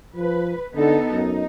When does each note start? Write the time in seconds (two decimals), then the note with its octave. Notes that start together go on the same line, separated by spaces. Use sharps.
0.16 F3 B4
0.75 D3 B3 D#4 A4
1.11 F#2 D#4